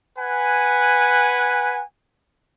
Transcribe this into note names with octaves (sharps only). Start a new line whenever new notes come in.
B4 F#5 G#5